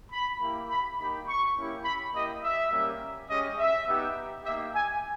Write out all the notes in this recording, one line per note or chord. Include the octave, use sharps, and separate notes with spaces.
B5
A#3 E4 G4
B5
A#3 D#4 G4 B5
C#6
A#3 C#4 E4 G4
B5
A#3 E4 G4 D#5
E5
G3 A#3 C#4 G4
G#3 C#4 G4 D#5
E5
B3 D#4 G4
A#3 D#4 G4 E5
G#5